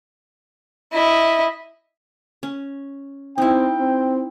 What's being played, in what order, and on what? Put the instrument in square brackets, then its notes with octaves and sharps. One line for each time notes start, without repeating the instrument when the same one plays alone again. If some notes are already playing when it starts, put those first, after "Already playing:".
[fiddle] E4 D#5
[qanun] C#4
[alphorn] C4 [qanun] D#4 E4 [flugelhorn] G5
[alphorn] C4